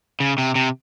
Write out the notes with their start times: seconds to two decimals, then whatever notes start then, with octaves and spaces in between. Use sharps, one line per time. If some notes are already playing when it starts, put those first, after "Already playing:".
0.20 C#3
0.38 C3
0.55 C3